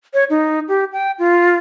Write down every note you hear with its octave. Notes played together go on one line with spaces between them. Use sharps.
C#5
D#4
G4
G5
F4